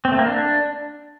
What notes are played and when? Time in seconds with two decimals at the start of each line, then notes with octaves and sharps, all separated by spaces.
0.05 C4
0.12 A3
0.19 A#3
0.25 D4